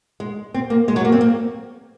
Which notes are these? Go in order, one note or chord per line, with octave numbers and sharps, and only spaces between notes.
G#3
C4
A#3
G#3
F#3
A#3
C4
A#3